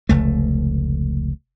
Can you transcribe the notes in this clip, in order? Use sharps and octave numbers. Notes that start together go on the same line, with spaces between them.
F1 C#2 A3